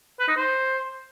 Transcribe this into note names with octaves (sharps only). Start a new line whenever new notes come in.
B4
D#4
C5